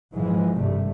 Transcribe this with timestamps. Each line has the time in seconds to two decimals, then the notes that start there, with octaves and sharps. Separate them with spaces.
0.13 G#2 E3 F3 G#3
0.58 G#1 G2 C3 G3 A3